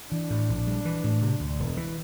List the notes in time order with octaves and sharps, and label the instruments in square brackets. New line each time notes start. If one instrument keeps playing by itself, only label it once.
[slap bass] E3 [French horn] D4
[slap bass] A2
A#1
G3
E3
A2
C3
D2
E1
E3